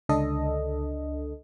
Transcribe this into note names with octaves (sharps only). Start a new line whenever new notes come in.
C#2 D3 D4 A4 D#5